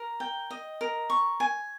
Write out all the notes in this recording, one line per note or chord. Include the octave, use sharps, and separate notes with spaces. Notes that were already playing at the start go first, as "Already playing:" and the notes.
Already playing: A#4
G5
D#5
A#4
C#6
G#5